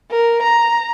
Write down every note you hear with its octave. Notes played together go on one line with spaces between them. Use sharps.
A#4
A#5